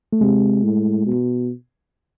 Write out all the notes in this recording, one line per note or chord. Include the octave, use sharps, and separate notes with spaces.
A3
C3 G#3
A2
B2